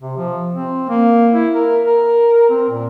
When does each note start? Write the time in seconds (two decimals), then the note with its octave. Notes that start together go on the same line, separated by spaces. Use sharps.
0.01 C3
0.17 F3
0.54 C4
0.89 A#3
1.33 E4
1.55 A#4
1.85 A#4
2.50 C4
2.70 A#2